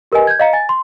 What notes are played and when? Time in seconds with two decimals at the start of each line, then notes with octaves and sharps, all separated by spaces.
0.12 G4 A#4 B4 D#5 G#5
0.27 G6 G#6
0.40 D#5 F5 A#5 C#7
0.53 G#5 A6
0.69 C6